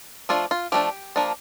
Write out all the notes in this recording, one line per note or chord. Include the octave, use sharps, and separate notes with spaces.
F3 A3 D4 F4
F4
F3 A3 D4 G4
F3 A#3 D4